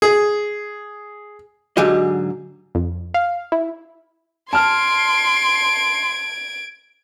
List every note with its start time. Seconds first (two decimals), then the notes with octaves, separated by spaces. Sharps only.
0.02 G#4
1.77 G#2 D3 F#3 G4 G#4 D#5
2.75 F2
3.14 F5
3.52 E4
4.53 A5 C6 F6 G#6 D7